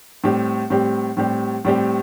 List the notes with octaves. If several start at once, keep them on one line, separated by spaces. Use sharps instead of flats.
A2 G3 C4 G4
A2 G3 C4 G4
A2 G3 C4 G4
A2 G3 C4 G4